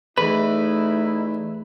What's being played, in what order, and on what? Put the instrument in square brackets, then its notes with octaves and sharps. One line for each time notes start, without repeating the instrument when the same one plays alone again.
[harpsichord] E2 [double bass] A3 [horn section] D#4 E4 [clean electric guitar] B4